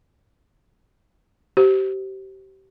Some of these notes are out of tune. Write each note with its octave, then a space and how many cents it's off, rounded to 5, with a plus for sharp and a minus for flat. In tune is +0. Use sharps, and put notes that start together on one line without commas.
G4 -30 C5 +0